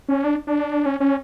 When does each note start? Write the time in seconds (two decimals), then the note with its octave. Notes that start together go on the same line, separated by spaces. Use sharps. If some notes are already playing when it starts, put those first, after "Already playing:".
0.09 C#4
0.24 D4
0.47 D4
0.86 C#4
1.00 C#4